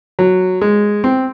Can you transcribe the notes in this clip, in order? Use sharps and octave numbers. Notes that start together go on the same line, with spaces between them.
F#3
G#3
C4